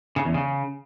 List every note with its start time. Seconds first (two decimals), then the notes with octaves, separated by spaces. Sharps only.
0.16 C#3
0.25 E2
0.34 C#3